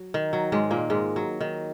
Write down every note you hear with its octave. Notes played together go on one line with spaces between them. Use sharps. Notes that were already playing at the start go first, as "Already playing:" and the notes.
Already playing: F#3
D#3
F#3
G#2 G#3
A#2 A#3
G#2 G#3
F#3
D#3